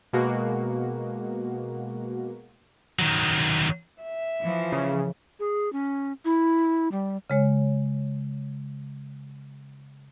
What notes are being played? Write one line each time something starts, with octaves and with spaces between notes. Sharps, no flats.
B2 G#3 A#3 F#4
D#3 F#3
E5
E3 F3
C#3
G#4
C#4
E4
G3
C#3 G#3 C#5